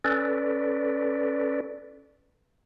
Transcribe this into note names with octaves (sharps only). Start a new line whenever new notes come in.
C#4 A4 B4 D5